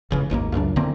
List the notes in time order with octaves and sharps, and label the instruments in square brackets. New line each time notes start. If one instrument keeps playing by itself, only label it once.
[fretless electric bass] E1 C#3 E3
G#1 D#2 D3 A#3
C#2 F#2 G3 D4
D3 E3 A#3 C4